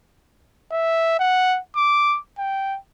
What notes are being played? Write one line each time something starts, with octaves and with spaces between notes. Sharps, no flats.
E5
F#5
D6
G5